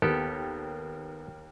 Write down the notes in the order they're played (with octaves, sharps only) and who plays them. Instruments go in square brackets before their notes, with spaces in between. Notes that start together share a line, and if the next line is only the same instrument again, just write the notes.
[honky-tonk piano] D#2 [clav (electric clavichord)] B3 G4 A4 [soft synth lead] A#4